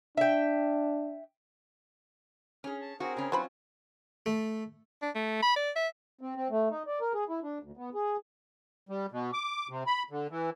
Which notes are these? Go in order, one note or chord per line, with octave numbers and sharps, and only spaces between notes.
D4 E5 G5
C#4 G#4 F6
A5
C4 F#4 G#4 A#4
C#3 C#4
E3 F#3 C4 C#4 F4 C5 B5
A3
D4
A3
B5
D5
E5
C4
C4
A3
D#4
D5
A#4
G#4
E4
D4
D2
B3
G#4
G3
B2
D6
C3
B5
D3
E3